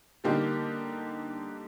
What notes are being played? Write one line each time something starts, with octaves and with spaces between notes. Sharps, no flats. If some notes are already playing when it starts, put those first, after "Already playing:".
D3 G3 A#3 D#4 G4